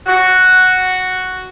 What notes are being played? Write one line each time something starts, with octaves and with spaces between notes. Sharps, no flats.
F#4